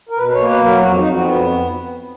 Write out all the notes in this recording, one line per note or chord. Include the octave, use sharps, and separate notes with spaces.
A#4
B2 B4
B4
C#5
A#3
B4
F#3 A#4
F2 F#4
D#4
F2
F#4
B3